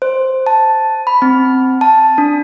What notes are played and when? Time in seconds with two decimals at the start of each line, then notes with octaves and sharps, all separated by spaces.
0.02 C5
0.46 A5
1.07 B5
1.22 C4
1.81 A5
2.18 D4